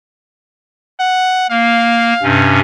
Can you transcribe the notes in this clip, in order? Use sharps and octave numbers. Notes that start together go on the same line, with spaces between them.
F#5
A#3 F5
G2 C3 C#4